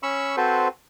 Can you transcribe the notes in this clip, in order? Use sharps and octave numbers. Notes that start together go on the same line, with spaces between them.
C#4 B5 C#6 E6
C4 F#4 A4 B4 C5